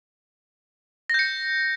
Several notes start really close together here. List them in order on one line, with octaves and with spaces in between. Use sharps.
A#6 G6 C#7